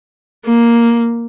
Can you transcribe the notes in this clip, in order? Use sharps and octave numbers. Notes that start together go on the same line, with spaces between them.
A#3